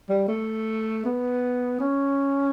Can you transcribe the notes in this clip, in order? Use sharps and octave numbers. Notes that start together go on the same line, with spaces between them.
G3
A3
B3
C#4